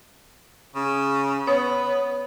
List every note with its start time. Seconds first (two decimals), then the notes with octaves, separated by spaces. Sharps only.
0.75 C#3
1.47 B3 C#5 D#6